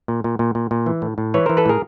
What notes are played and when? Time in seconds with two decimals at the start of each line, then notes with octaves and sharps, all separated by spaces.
0.08 A#2
0.24 A#2
0.39 A#2
0.55 A#2
0.71 A#2
0.86 E3
1.02 A2
1.18 A2
1.34 E3 B4 C#5
1.46 E3 A#4 C5
1.57 A4 B4
1.66 A2 G#4 A#4